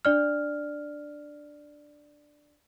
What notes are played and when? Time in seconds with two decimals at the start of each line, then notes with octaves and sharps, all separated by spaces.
0.05 D4 D5 F6